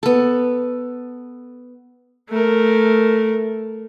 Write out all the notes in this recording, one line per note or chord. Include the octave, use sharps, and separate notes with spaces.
B3 A4
A3 A#4